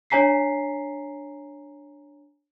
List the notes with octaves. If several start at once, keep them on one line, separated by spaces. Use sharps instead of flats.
D4 C#5 G#5 A#5 B6 C7